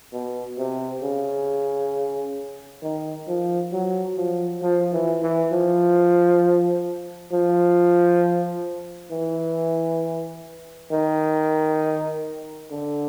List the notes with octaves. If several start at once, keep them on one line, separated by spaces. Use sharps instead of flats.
B2
C3
C#3
D#3
F3
F#3
F3
F3
E3
E3
F3
F3
E3
D#3
D3